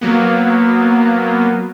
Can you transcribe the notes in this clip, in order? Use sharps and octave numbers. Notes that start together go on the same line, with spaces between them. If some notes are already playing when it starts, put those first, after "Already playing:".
F#3 A#3 B3